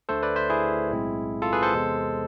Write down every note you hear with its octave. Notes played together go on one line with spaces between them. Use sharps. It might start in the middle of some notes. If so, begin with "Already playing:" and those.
D2 D3 A3 A4 C5
B4 D5
C5 E5
E4 G#4
B1 A2 G#3 C4
F4 A4
G#4 B4
A4 C5
E2 C3 G#3 B3